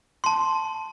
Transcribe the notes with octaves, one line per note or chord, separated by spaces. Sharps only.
A5 C6